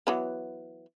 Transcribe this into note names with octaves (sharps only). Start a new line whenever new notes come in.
E3 F#3 B3